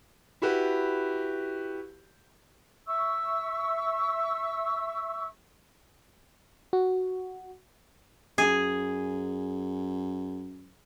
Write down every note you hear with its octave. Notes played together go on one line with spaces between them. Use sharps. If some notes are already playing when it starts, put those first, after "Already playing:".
E4 F#4 G4 B4
E5 C#6 E6
F#4
F#2 G#4